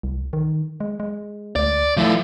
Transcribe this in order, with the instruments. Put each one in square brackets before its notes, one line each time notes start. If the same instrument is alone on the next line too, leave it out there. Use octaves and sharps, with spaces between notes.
[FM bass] C2
D#3
G#3
G#3
[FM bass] D2 [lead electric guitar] D5
[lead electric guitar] F3 E4 [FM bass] A3